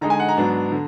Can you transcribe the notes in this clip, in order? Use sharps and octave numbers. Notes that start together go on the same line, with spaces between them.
D3 G#3 D#4 A#5
G#5
F#5
A#5
G#2 F#3 B3 D4
D3